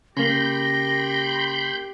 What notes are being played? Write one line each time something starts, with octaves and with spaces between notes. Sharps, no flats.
C#3 A#3 G4 G5 B5 C6 G6 A#6